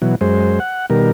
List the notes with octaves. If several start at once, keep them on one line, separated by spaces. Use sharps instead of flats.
B2 E3 F#3
F#2 G#3 C5
F#5
B2 D#3 G3 A#4